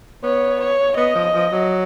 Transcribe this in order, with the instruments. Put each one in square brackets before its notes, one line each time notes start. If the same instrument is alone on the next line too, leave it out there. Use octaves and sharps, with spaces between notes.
[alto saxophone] B3 [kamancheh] C#5
[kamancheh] C#5
[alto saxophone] B3 [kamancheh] D#5
[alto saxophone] F3
F3
F#3